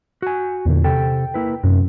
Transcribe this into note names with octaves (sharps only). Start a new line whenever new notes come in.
F#4 G#5
E2 A#2 D3
C3 G4 A4 G5
A#3 E4 B4
F#2 C3